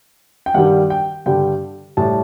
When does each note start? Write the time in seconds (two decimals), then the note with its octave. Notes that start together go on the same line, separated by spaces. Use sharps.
0.46 G5
0.54 G2 D#3 G3 F#5
0.90 G5
1.26 G2 D3 G3 G5
1.97 A2 G3 A5